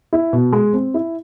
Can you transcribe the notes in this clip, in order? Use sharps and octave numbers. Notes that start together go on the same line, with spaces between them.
E4
B2
G#3
C4
E4